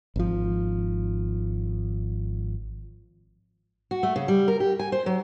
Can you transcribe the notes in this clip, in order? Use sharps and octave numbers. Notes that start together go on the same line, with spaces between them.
G#1 F3
F#4
A3
C#3
G3
A#4
G4
G#5
C5
F#3